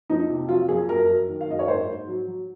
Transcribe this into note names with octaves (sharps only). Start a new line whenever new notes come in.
F2 D#4
C3
F#3 F4
F2 G#4
F#2 A#4
F#3
D#3
F5
F#2 D#5
C#5
G#2 C5
G#2
F#3
F#3